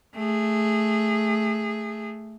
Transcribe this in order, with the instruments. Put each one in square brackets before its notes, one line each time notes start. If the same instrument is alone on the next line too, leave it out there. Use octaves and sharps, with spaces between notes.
[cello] A3 G#4